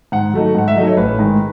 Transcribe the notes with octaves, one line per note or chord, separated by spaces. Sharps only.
G#2 F#5
F#3 A3 D#4
G#2 F#5
E5
F#3 A3 D#4 D#5
C#5
A1 B4
G#2 D#3 G#3